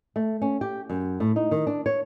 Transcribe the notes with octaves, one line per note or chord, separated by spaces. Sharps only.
A3
C#4
G4
F#2
A2
D#4
D#3
D4
C#5